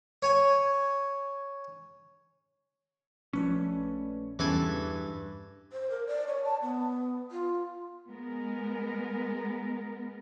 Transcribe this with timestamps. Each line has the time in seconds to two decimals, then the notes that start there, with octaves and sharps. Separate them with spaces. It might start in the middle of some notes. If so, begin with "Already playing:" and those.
0.22 C#5 G#5
3.33 A#1 A3 C#4 B4 D5
4.39 E2 G2 C#3 E3 A4 G#5
5.72 C5
5.90 A#4
6.07 D5
6.27 C#5
6.44 A5
6.62 B3
7.31 F4
8.09 G#3 B3 A#4